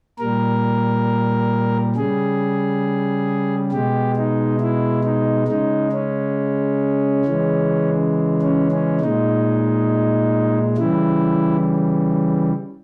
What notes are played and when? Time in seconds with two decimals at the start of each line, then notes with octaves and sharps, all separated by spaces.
0.19 A#2 G3 A#4
1.96 C#3 G3 G#4
3.71 B2 G#3 G4
4.16 D#4
4.60 E4
5.04 D#4
5.48 C#3 G#3 D#4
5.92 C#4
7.25 C#3 E3 G#3
8.42 C#4
8.72 C#4
9.00 A#2 G#3 D#4
10.77 C#3 E3 G3 E4